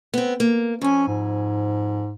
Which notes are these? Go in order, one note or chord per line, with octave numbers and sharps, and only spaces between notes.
B3 C4
A#3
F2 C#4 G#5
G#2